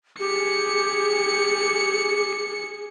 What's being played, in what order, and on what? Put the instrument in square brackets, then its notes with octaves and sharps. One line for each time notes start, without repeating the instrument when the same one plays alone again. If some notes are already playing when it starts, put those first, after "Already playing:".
[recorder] G4 [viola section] G#4 [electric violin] C#7